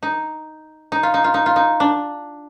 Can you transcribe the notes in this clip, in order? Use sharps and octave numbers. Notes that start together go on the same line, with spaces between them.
D#4
D#4
F4
D#4
F4
D#4
F4
D#4
D4